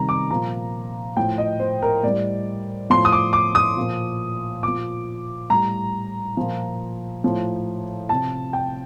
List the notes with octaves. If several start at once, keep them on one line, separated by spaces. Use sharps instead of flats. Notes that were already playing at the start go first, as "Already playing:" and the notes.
Already playing: C3 D#3 G3 A#5
D6
A#2 F3 A#5
A2 F3 G5
D#5
C5
A#4
A2 G3 D5
A2 F3 C6
D#6
D6
D6
D#6
A#2 F3
A#2 F3 D6
A2 G3 A#5
A#2 F3
A2 F3
C3 F3 A5
G5